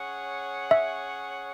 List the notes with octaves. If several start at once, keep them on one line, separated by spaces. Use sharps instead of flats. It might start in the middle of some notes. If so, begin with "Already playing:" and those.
Already playing: C#4 G#4 C#5 F#5
E5